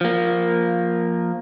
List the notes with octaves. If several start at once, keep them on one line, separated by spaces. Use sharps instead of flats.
F3 A#3